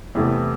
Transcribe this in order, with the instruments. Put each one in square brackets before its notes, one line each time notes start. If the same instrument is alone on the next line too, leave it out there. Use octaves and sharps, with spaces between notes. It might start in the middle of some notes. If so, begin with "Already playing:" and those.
[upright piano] E2 C3 E3 A3